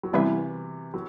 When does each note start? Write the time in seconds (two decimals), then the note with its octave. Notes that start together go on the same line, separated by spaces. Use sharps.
0.03 F#3
0.13 C3 E3 G3 B3 E4 B4 E5
0.94 F#3